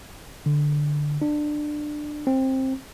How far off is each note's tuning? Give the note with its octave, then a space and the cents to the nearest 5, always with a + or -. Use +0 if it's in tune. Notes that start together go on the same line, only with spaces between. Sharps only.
D3 +5
D4 +20
C4 +15